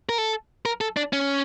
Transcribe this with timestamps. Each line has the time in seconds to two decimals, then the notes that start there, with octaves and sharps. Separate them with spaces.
0.09 A#4
0.18 A4
0.66 A#4
0.81 A4
0.97 D4
1.13 C#4